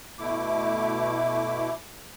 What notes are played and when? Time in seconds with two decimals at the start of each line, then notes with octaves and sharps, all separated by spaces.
0.19 B2 A3 E4 D6